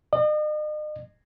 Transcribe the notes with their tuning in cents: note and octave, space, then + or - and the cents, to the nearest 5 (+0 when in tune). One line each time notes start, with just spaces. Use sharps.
D#5 -40